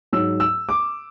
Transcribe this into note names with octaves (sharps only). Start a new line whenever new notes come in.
G#2 F#3 E6
E6
D6